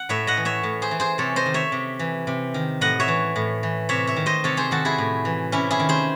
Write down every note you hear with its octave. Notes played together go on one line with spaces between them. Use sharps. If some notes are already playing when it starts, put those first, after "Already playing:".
Already playing: F#5
A2 C#5 E5
D#5 F#5
E3
C#5 E5
A2
G#4 C5
E3
G#4 C5
C3 A4 C#5
C5 D#5
D#3
C#5 E5
C3
E3
C3
D#3
A2 D#5 F#5
C#5 E5
E3
A2
E3
C3 C#5 E5
C#5 E5
D#3
C5 D#5
C3 A4 C#5
G#4 C5
D#3 F#4 A4
E4 G#4
A2
E3
C3 C#4 E4
E4 G#4
D#3
G#4 C5